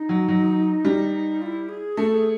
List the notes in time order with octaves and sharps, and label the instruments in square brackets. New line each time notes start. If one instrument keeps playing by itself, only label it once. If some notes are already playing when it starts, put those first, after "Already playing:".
Already playing: [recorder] D#4
[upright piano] F#3
F#3
G3
[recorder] F4
E4
G#4
[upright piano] A3 [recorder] A4
[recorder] G#4